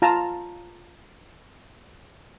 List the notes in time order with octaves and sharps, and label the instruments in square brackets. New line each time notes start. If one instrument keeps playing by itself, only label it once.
[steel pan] F4 A5 A#5